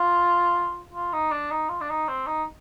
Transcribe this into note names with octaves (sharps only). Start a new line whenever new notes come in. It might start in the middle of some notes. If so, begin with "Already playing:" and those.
Already playing: F4
F4
D#4
D4
D#4
F4
D4
D#4
C4
D#4